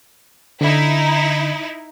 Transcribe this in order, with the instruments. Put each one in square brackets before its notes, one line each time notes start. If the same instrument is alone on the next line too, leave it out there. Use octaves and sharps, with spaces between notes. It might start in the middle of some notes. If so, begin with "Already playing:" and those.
[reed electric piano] D3 [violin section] D#4 E4